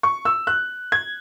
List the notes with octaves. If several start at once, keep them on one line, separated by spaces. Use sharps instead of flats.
C#6
E6
F#6
G#6